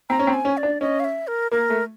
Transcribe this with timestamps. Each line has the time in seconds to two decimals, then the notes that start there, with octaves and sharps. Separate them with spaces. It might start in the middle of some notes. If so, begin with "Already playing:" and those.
0.10 C4 A#5
0.19 C#4
0.27 C4
0.34 G#5
0.45 C#4
0.57 D5
0.63 D4
0.81 C#4 D#5
1.00 F5
1.04 E5
1.27 A#4
1.52 A#3 A#4
1.70 A3